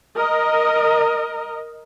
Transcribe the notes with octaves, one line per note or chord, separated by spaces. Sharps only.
A#4 D#5